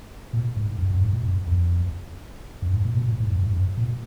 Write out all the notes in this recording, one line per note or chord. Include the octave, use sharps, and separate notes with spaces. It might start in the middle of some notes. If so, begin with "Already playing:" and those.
A#2
G#2
F#2
F#2
G#2
A#2
F#2
F2
F#2
G#2
A#2
B2
A#2
G#2
F#2
G#2
F#2
A#2